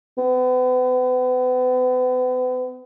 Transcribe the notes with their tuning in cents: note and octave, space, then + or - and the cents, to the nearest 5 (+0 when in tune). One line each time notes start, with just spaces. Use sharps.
B3 +40